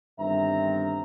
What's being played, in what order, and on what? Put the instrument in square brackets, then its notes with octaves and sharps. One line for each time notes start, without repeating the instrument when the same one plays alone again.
[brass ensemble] G1 G2 D#3 C4 E5 A#5